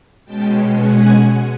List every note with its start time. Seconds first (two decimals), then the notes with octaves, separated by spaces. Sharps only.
0.25 B2 G#3 C#4 G5 A5
0.78 F#5 G#5